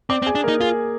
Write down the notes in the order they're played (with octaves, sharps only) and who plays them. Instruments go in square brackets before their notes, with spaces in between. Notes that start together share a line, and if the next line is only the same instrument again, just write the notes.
[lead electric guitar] C4 [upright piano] D5 D6
[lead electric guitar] C4
[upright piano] G#4 G#5
[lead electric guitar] D4
[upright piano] A#3 A#4 [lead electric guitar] D#4
[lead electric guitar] F4 [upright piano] G#4